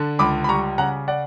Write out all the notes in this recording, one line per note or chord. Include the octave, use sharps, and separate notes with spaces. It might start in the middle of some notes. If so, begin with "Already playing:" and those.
Already playing: D3 D4
C#2 B5 D6
B5
G3 A#5 C#6
C#3 F#5 A#5
D5 F#5